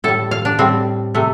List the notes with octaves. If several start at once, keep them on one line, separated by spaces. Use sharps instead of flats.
A2 G3 A4
F5
D4
A2 G3 C4
C3 A3